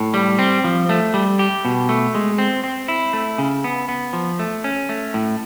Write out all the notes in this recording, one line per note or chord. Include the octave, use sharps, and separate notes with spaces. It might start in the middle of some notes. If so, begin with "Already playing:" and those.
Already playing: A2
G3
C4
F3
A3
G3
G4
B2
A3
G#3
C4
C4
E4
A3
C#3
B3
B3
F3
A3
C#4
A3
A2